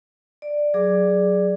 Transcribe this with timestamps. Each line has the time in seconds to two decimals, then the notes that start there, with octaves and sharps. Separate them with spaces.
0.42 D5
0.74 F#3 G#4 D5 D6